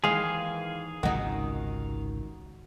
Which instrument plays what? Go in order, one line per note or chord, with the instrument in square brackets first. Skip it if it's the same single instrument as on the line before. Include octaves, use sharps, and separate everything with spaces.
[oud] D#2 D#3 E3 [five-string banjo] G#3 [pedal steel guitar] G#4 F5
[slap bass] G#1 C#2 C3 [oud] D#3 D#4 [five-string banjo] F#3